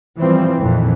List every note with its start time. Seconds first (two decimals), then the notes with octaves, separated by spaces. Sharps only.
0.18 E3 F3 G3 C4
0.58 A#1 F2 A#2 D#3 E3